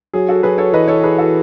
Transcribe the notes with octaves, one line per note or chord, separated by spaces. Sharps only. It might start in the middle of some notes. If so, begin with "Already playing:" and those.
F#3 G#4
F#4 A4
F#3 G#4 B4
A4 C#5
E3 B4 D#5
A4 C#5
G#4 B4
F#4 A4